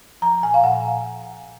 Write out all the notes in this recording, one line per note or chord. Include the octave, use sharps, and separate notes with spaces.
F3 A#5
A#2 G#5
F5
A#2 F#5